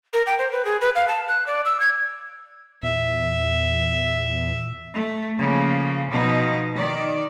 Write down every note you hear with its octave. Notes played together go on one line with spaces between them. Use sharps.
A#4
G5
C5
B4
G#4
B4
F5
A5
F#6
D5
E6
G#6
E2 A#2 E5
A3
C#3 F3 A#3
B2 F3 D#4
D#3 D5